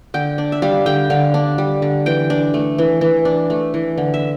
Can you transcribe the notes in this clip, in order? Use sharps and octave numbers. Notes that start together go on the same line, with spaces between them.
D3 G5
D4
E5
G3 F5
D3 G5
D3 F5
D4
G3
D3
E3 G5
D4
A3
E3
E3
D4
A3
E3
D3
E5